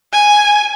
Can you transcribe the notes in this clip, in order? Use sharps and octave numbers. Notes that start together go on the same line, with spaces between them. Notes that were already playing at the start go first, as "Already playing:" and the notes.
G#5